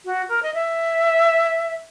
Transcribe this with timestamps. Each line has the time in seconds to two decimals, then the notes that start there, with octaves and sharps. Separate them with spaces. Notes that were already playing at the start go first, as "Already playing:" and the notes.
0.05 F#4
0.29 A#4
0.43 D#5
0.54 E5